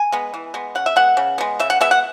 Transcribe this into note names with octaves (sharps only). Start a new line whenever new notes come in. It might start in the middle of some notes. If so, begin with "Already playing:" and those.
Already playing: G#5
G#3 B3
E3
G#3 B3
C#3 F#5
E5
G#3 B3 F#5
C#3
G#3 B3
C#3 E5
F#5
G#3 B3 E5
F#5